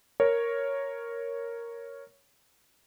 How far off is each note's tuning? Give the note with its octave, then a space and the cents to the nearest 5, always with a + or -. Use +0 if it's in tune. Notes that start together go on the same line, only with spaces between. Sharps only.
A#4 +0 C#5 +0